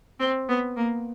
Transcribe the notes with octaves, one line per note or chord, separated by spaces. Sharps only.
C4
B3
A#3